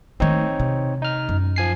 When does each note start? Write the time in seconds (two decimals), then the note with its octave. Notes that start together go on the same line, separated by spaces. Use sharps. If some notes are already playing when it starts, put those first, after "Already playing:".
0.20 D#3 A3 C4 D#4 C#5
0.60 C3
1.02 D#4 F6
1.29 F#2
1.56 F3 G#5 C7